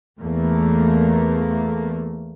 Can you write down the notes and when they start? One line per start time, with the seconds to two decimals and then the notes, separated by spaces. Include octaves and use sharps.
0.21 E2 A3 A#3